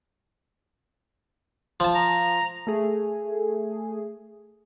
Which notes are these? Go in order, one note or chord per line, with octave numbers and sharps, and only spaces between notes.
F3 A5
A#5
A3 G#4